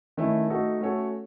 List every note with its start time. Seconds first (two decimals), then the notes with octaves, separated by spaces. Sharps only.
0.17 D#3 A3 C#4 E4
0.49 A3 D#4 F#4 A4
0.81 A3 C#4 F#4 A4 C#5